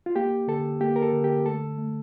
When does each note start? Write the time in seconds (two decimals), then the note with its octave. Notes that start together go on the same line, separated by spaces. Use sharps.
0.06 F4
0.16 A#3 G4
0.48 D3 A4
0.81 A#3 G4
0.96 A#4
1.02 A4
1.13 D3
1.24 G4
1.45 A3 A4
1.78 A3